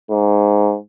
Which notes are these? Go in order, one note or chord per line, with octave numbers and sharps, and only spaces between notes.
G#2